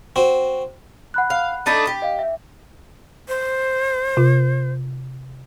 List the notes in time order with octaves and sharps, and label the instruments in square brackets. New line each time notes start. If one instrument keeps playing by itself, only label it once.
[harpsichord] C4 F#4
[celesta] F#5 B5 F#6
[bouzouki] F5
[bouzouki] A3 D4 D#4 [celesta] B5 A6 D#7
[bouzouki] G4
[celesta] D#5 F5
E5
[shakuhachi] C5
[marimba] C3 F4